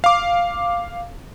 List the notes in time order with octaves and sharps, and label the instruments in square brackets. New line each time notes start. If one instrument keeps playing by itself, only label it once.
[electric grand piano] F5 D6